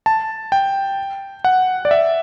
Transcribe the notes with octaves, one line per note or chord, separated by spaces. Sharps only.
A5
G5
F#5
D5
E5